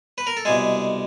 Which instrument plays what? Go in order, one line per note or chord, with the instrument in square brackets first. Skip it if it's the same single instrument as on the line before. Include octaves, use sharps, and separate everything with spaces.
[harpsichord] B4
A#4
A4
C2 B2 G#3 G#4